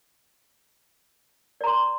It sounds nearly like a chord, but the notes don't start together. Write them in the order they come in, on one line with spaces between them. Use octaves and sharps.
D5 A#5 C6